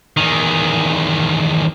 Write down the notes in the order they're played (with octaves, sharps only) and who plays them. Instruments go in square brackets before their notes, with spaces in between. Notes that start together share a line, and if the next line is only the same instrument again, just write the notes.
[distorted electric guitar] E2 D#3